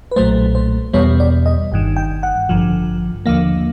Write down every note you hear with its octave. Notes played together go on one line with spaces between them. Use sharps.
B4
B1 A#2 F#3 A3 C5
C5
E2 B2 G3 B3 C#5
D5
D#5
G1 G2 D#3
G5
F#5
A1 G2 D3 F3
D#2 D3 F3 A#3 F5